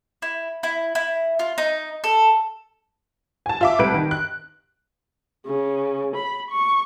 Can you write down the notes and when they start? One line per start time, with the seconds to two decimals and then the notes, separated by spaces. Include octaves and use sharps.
0.22 E4
0.63 E4
0.95 E4
1.39 F4
1.58 D#4
2.04 A4
3.46 G#5 A5
3.61 F4 E5 D6
3.79 C2 B4 D7
3.94 D#3
4.11 F#6
5.47 C#3
6.16 B5
6.51 C#6